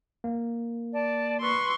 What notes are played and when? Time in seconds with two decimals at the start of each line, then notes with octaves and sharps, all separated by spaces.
0.24 A#3
0.93 D5 A5
1.41 B4 C6 C#6 E6